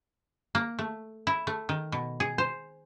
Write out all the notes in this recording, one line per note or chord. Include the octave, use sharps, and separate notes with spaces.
A#3
A3
E4
A3
D#3
B2
G#4
C5